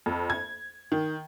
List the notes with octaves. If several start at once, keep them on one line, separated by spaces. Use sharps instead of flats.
F2
G#6
D#3